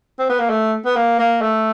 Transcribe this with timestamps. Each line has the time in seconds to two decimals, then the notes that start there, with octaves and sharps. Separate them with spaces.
0.19 C4
0.29 B3
0.39 A#3
0.50 A3
0.86 B3
0.96 A#3
1.19 A#3
1.42 A3